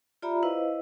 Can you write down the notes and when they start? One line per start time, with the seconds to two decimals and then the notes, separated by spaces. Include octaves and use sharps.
0.22 F4 G4 D5 E5 A#5 B5
0.43 E4 B4 C5 D#5 F5